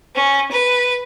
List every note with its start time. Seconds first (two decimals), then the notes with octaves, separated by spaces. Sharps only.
0.15 C#4
0.51 B4